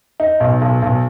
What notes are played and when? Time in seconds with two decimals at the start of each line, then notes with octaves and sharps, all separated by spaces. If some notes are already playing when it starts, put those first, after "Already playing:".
0.20 D#4
0.40 B1
0.61 B1
0.82 B1